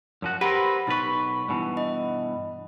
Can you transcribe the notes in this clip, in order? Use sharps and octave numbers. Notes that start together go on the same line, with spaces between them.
F#2 F3 F#4
C4 G4 A#4 B4 F#5 A#6
B1 D#4 B4 C#6
G2 B2 E3
D#5